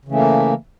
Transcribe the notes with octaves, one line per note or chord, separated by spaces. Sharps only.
C#3 E3 A3 A#3